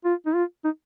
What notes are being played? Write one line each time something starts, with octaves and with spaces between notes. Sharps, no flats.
F4
D#4
F4
D#4